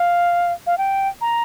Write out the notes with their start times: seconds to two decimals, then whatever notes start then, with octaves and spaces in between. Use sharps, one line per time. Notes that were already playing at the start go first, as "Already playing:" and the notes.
Already playing: F5
0.67 F5
0.78 G5
1.21 A#5